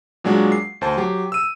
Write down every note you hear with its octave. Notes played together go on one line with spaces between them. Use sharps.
A#2 F#3 G#3 D4 F#4
C7
D2 C5 A5
F#3 G4
E6 D#7